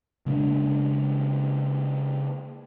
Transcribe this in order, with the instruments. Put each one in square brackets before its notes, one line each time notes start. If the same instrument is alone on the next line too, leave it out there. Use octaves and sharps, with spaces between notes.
[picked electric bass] C#3 G#3 A#3 D4